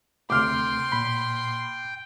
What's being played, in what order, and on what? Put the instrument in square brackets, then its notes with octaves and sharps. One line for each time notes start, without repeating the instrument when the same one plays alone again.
[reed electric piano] D2 C3 A3 [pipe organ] G5 [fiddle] C6 [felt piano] D6 F6
[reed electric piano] A#2 B5